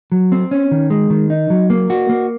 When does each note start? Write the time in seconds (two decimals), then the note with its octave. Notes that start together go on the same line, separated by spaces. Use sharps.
0.12 F#3
0.32 C4
0.51 C#4
0.71 D#3
0.90 G#3
1.10 D#3
1.30 D#4
1.50 F#3
1.70 A#3
1.90 F#4
2.09 A#3